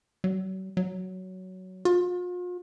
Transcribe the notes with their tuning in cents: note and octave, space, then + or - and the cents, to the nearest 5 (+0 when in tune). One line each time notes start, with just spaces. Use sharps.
F#3 +40
F#3 +10
F4 +40